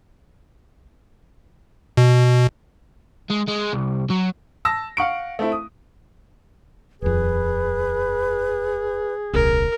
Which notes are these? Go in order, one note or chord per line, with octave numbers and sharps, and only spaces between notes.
B2
G#3
G#3
C2
F#3
A5 E6 A#6
F5 F#5 C#6 D7
A3 C4 E4
D#6
D#1 F2 G#4 B4
D#1 C2 A#4